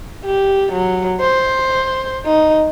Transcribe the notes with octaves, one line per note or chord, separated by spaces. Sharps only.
G4
F#3
C5
D#4